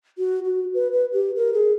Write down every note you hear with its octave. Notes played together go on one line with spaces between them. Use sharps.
F#4
F#4
B4
B4
G4
A#4
G#4